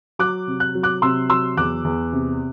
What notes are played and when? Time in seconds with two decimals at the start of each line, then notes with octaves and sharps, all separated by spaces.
0.19 F#3 D6 F#6
0.47 C3
0.60 F#6
0.75 F#3
0.83 D6 F#6
1.02 C3 C6 E6
1.30 F#3 C6 E6
1.57 E2 D6 F#6
1.84 E2
2.13 C3